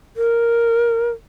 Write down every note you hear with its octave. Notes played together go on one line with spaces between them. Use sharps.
A#4